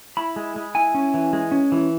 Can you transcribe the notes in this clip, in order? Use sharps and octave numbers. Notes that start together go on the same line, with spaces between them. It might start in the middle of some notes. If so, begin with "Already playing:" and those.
E4 B5
G#3
G#3
E4 G#5
C#4
E3
G#3
C#4
E3